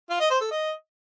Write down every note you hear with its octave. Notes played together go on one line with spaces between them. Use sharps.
F4
D#5
C5
A4
D#5